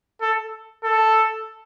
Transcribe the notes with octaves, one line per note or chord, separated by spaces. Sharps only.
A4
A4